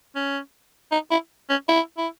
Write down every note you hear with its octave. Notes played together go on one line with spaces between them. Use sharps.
C#4
D#4
E4
C#4
E4
E4